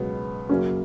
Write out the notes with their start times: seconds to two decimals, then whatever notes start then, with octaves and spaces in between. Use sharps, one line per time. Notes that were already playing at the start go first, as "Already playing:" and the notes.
Already playing: C#2 B2 F#3 B3
0.49 F#2 C#3 F#3 A#3 C#4